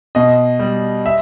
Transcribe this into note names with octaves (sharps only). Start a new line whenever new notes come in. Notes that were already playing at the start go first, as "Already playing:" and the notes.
B2 D#5
G3
E5